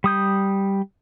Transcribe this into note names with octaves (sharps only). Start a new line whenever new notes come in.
G3 D#6 G6